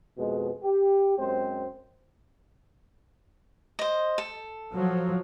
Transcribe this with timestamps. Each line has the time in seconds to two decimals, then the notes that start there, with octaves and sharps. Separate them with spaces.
0.18 F2 B2 G#3
0.63 G4
1.18 F#2 G#3 C4 C5
3.79 C5 D#5
4.18 A4
4.74 F3 F#3